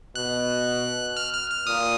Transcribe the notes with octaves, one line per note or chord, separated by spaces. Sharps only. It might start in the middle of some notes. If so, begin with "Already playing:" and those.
B2 F#6
F6
F6
F6
A#2 D#6